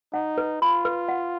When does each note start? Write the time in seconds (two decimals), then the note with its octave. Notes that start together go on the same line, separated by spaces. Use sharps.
0.13 D#4 F#5
0.38 B4
0.62 F4 B5
0.85 B4
1.08 F#5